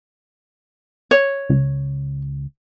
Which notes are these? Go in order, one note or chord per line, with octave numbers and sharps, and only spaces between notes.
C#5
C#2